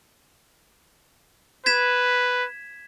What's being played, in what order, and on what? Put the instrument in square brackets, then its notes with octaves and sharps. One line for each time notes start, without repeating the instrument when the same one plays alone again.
[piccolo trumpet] B4 [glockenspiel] G#6 B6 E7